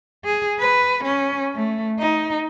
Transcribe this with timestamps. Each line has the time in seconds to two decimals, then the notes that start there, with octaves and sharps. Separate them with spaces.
0.25 G#4
0.59 B4
1.04 C#4
1.55 A3
1.99 D#4